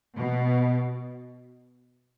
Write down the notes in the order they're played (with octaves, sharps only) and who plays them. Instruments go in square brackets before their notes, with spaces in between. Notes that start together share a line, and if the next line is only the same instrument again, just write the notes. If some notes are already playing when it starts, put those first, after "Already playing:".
[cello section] B2